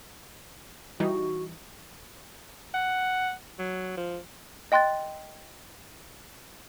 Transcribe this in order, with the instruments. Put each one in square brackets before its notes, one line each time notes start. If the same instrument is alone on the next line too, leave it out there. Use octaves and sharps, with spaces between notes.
[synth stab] E3 G3 D#4 [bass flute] F#4
[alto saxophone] F#5
F#3
F3
[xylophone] D#5 G5 C6 F#6 A6